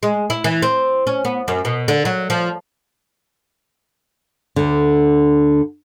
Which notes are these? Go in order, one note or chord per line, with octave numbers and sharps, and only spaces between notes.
G#3
E4
E3
C4
C#4
B3
F#2
B2
D3
F#3
F3
D2 D3